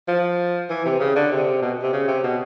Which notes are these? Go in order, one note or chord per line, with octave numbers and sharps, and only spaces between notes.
F3
E3
C3
C#3
D3
C3
B2
C3
C#3
C3
B2